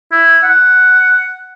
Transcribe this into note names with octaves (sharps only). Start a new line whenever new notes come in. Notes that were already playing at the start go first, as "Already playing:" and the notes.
E4
F#5